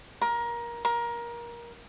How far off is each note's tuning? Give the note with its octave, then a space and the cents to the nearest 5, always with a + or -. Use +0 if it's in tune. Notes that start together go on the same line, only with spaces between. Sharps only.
A#4 +20
A#4 +20